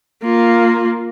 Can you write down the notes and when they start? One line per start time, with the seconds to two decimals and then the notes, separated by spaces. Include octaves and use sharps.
0.23 A#3 F4